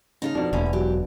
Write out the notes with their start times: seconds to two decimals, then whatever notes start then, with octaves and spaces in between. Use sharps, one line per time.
0.22 C#3 D#4 A4 F5
0.35 F2 B2 D4
0.53 E1 D#2 D3 E3 C#4 E4
0.73 F#3 G4